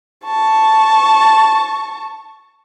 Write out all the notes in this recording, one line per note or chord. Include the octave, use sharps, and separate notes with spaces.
A5 C#6